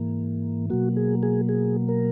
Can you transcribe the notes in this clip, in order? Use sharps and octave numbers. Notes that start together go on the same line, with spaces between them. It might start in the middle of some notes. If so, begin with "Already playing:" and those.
Already playing: G#2 E3 A#3
B2 F#3 A#3 F#4
G#4
G#4
G#4
A#4